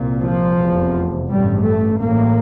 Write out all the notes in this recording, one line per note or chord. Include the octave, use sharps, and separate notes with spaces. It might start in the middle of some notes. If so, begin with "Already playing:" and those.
Already playing: C2 A#2
F3
F1 E2 C3
A1 G2 G3
A3
A1 A2 A#3